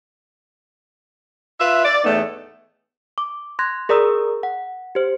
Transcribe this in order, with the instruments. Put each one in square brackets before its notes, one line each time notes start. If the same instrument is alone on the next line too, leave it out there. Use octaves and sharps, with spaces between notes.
[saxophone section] F4 B4 E5
D5
E2 A2 A3 B3 D#4
[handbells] D6
C6 F#6 G#6 A#6
G#4 A#4 D5 A#5 D#6 E6
F#5
G4 C5